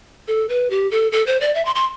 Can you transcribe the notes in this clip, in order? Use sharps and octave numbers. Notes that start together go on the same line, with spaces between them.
A4
B4
G4
A4
A4
C5
D5
E5
C6
C6